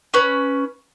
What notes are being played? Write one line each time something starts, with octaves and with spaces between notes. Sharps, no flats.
C#4 B4